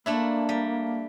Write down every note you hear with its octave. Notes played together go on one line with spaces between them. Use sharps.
A3 A#3 D4 E4
G3